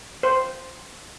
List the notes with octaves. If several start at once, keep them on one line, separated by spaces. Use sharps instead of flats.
C5